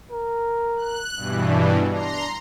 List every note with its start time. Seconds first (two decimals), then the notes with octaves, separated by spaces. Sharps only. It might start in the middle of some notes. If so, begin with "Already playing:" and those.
0.11 A#4
0.77 F#6
1.16 G2 B2 E3
1.48 D4
1.91 D4 A#5 C6